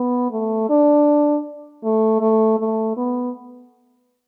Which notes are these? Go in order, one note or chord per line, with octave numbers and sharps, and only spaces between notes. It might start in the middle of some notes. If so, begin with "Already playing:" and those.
Already playing: B3
A3
D4
A3
A3
A3
B3